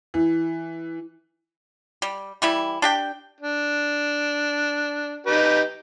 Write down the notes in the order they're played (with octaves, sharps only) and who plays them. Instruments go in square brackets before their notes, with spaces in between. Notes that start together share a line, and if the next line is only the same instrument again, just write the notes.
[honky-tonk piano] E3
[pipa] G3
E3 G3 E4
D4 G4 G5
[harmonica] D4
D#4 G4 B4